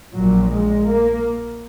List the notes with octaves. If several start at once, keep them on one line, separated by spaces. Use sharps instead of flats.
A#1 A#2 F#3
G#3
A#3